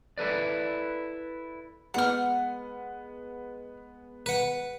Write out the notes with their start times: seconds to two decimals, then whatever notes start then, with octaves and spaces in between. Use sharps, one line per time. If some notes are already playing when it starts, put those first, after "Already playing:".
0.18 E4 A4 B4 D5
1.94 G#3 B3 F#5 F6
4.26 B4 F#5